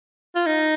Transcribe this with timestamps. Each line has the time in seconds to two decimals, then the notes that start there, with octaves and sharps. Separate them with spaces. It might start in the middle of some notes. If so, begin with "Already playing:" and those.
0.35 F4
0.46 D#4